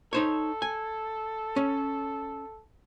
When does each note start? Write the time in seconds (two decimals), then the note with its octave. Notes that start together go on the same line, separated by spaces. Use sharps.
0.13 D#4 A4 C5 C#5
0.62 G#5
1.56 C#4